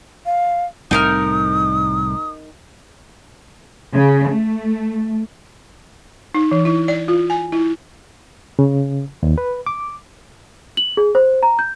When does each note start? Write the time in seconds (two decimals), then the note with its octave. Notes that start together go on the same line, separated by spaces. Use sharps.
0.26 F5
0.91 C2 A2 C3 D#4 A#4 D#6 F6
3.93 C#3
4.30 A3
6.34 D#4
6.51 E3
6.65 E4
6.88 D5
7.08 F4
7.30 G#5
7.52 E4
8.59 C#3
9.23 D#2
9.38 B4
9.67 D6
10.77 F#7
10.97 G#4
11.15 C5
11.43 A#5
11.59 G6